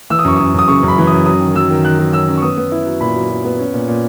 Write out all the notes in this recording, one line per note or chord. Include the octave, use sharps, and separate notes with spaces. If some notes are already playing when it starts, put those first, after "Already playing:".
E3 E6
D#6
F#2 C#6
F#2 D#6
F#2 D#6
C#3 C#6
F#2
B5
E3
F#2 D#6
F#3 D#6
D#3
F#3 E6
D#3
D#3 F#6
F#3
C#4 E6
C#4
C#6
B3 D#6
B3
E4
F#3
A#2 B5
F#3
F#3
B3
C#4
A#2
A#2